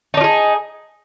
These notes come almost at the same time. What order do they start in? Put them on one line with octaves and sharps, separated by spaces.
D#4 D4 F4 G#4